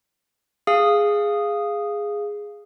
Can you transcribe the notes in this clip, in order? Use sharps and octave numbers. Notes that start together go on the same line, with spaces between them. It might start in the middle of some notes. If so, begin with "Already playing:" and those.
G#4 F5 D#6